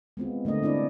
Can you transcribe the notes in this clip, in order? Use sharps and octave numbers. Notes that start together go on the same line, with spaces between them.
G#3 B3 C4 F4
D3 A3 A#4 D#5
C4 D4 E4 D5